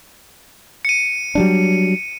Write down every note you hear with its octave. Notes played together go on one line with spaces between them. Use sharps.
C#7 D#7
F#3 G3 D4